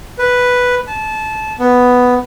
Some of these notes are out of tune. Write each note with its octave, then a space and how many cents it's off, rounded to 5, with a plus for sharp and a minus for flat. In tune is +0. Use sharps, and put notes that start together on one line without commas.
B4 +0
A5 -20
B3 +5